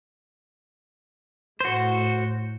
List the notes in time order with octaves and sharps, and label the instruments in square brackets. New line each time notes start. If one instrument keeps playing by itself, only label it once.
[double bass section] A2 [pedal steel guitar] F#4 C5